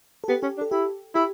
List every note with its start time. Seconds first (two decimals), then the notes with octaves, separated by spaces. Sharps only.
0.24 A4
0.28 B3 G4
0.43 C#4 G4
0.58 D4
0.61 A4
0.71 E4 G4
1.15 E4 G4